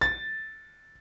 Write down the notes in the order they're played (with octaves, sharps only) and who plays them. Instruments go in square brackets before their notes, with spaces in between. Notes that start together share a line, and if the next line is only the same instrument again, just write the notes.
[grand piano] A6